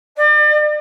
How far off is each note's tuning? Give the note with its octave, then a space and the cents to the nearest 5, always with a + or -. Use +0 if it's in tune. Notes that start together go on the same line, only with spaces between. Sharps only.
D5 +40